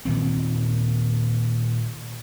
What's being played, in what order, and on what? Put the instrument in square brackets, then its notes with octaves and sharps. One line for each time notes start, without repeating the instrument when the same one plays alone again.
[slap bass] A#2 D#3 C4